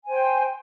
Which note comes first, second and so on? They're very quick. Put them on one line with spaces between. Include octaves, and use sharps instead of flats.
G#5 C5 G5